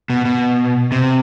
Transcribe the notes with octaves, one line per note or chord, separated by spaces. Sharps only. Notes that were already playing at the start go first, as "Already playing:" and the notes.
B2
B2
C3